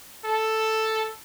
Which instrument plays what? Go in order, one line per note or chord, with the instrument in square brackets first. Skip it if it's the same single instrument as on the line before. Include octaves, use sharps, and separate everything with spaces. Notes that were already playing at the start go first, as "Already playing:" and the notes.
[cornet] A4